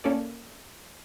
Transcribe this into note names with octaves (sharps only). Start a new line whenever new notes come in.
A#3 C#4 A4 D5